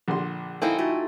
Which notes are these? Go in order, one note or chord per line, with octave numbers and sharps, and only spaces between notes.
A#1 D3 C6
A#3 C4 D#4 E4 A4 G5 G#5
A3 D#4 F4 F#4